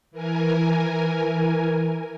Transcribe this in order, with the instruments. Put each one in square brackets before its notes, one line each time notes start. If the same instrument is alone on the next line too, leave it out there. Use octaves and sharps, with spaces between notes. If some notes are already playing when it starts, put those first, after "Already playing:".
[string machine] E3 A#4 G#5